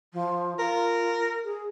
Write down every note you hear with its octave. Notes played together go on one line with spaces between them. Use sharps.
F3
F4 A#4
G#4